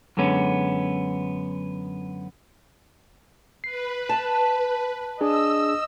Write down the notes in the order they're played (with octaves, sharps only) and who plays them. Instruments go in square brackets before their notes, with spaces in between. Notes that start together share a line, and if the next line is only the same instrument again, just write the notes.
[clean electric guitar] F#2 D3 G#3 B3 C#4
[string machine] B4 [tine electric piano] C7
[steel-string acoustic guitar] A5
[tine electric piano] D4 G#4 [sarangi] D#5 [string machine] E6